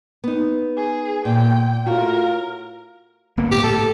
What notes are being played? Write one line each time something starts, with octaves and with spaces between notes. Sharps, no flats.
B3 D#4
G#4
A#2 G5
A2 F4 F#4 A#4
G1 A#3 B3
A2 B3 G4
A2 A4